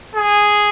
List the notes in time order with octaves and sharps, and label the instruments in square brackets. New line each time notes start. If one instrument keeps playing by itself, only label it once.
[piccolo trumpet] G#4